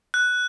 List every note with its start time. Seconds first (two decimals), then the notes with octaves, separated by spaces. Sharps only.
0.14 F#6